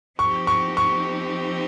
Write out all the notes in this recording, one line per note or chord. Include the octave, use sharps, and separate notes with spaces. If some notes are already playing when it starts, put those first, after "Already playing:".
F3 C4 D#4 G4 C#6
C#6
C#6